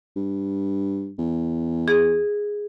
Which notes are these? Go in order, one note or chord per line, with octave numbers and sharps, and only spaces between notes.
G2
E2
G#4